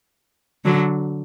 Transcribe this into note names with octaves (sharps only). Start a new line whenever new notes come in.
D3 F#3